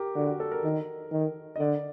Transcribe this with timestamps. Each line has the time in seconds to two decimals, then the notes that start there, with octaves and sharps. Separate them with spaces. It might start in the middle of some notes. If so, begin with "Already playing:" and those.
Already playing: G4 A#4
0.16 D3 F#4
0.28 F#4
0.40 A4
0.52 A#4
0.64 D#3
1.11 D#3
1.56 D#5
1.59 D3 D5